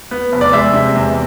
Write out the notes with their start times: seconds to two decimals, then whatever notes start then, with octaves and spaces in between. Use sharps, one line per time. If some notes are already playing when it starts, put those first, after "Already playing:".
0.11 B3
0.32 F1
0.41 D5
0.53 G#3 E5
0.74 C3
0.95 E2